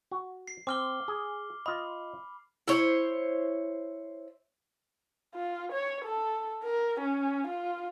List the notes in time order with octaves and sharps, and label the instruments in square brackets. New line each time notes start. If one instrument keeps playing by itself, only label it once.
[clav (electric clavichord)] F#4
[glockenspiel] C7
[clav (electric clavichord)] C4 [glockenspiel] D6 F6 G7
[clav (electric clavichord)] G#4
[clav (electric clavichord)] F4 D#5 [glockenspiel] B5
[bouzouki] E4 C5 C#5
[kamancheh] F4
C#5
A4
A#4
C#4
F4